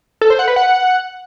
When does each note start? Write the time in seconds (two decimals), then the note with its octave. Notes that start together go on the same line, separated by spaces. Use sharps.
0.21 A4
0.30 C5
0.39 F#5
0.48 B4
0.56 F#5